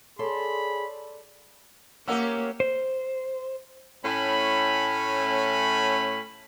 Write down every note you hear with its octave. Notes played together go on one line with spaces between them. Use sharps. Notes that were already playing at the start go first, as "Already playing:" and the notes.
G#4 A4 C#5 D5 B5 C6
A#3 C#4 G4 A#4 F#5 E6
C5
A2 C#4 B5